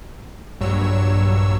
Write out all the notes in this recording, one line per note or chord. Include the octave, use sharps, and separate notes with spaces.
A#1 G2 F#3 C#5 E6